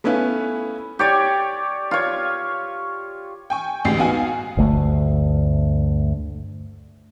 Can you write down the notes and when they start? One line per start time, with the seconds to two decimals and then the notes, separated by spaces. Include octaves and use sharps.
0.04 A3 B3 C#4 E4 B4 F5
0.99 G4 C#5 D5
1.91 F4 C#5
3.50 G5 G#5 C#6
3.85 A1 D2 G#2 G4 C7
3.98 B3 D#4 F#4 F5 G#5
4.57 G1 D2 A3